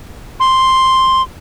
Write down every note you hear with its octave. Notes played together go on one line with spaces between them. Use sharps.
C6